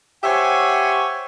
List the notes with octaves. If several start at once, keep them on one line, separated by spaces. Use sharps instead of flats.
G4 C5 C#5 E5 F#5 G#5